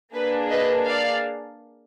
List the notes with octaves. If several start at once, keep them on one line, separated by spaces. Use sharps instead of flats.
A#3 D4 G#4 B4
B4 D#5
D5 F5